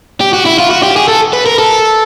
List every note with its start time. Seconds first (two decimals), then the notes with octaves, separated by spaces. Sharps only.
0.21 G4
0.33 F#4
0.46 E4
0.59 F4
0.70 F#4
0.83 G4
0.96 G#4
1.08 A4
1.33 B4
1.46 A#4
1.59 A4